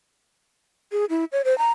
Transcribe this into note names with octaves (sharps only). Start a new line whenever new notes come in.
G#4
E4
C#5
C5
A#5